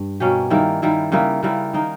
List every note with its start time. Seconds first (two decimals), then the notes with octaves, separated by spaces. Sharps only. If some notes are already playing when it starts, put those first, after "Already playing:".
Already playing: G2
0.20 B2 A#3 C#4 G4
0.50 D#3 G3 A#3 E4
0.82 D#3 G3 A#3 E4
1.12 C#3 G3 A#3 E4
1.43 C#3 G3 A#3 E4
1.73 D#3 A#3 D#4